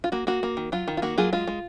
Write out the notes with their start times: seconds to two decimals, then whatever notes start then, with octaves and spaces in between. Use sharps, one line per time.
0.04 F4
0.12 A#3 F#4
0.27 A#3 F#4
0.43 A#3
0.57 D#3
0.72 F#3 F4
0.88 D#3
0.97 F4
1.02 A#3 F#4
1.18 F#3 F4 G#4
1.33 G#3 F4
1.47 G#3